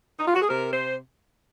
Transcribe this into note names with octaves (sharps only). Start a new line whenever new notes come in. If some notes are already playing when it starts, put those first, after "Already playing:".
D#4
F4
F#4
G#4
C3 A#4
C5